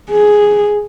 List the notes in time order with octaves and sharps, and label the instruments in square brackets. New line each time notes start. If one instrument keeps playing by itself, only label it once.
[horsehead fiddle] G#4